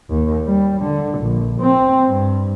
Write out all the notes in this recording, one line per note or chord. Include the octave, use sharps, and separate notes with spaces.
D#2
G3
D3
A#1
C4
G2